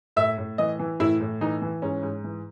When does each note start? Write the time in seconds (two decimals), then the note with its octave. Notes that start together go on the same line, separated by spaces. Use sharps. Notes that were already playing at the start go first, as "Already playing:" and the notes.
0.16 A2 E5
0.38 A2
0.58 E3 D#5
0.79 E3
1.00 A2 E4
1.21 A2
1.41 E3 D#4
1.62 E3
1.82 G#2 C#4
2.03 G#2
2.24 E3